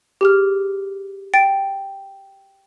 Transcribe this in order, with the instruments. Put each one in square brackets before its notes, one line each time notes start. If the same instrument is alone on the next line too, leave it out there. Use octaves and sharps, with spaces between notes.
[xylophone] G4 G#4 F6
G5 A6 D7